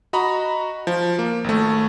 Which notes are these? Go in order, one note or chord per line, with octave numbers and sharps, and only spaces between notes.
F#4 D#5 A#5 B5
F3
A#3
G#1 A3